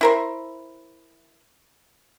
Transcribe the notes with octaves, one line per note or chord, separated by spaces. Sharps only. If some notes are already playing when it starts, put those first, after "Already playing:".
E4 A#4 C5